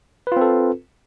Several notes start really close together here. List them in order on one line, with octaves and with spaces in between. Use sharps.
B4 F4 C4 A4